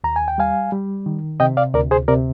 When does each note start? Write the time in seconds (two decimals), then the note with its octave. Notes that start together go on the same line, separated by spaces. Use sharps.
0.04 D#2 A#5
0.16 G#5
0.28 G5
0.38 G3 F5 G#5
0.72 G3
1.06 D#3
1.40 C3 D#5 G5
1.57 D5 F5
1.74 D2 A#4 D5
1.91 G#4 C5
2.08 C3 A#4 D5